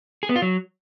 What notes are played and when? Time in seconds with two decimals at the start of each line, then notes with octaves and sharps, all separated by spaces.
0.23 G#4
0.29 B3
0.36 F4
0.42 F#3